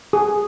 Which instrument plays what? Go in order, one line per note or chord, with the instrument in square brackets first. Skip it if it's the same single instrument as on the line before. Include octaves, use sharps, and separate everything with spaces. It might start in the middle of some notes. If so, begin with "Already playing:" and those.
[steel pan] G#4